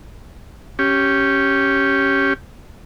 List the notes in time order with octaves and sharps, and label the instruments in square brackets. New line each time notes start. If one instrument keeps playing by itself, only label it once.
[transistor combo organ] C#4 G4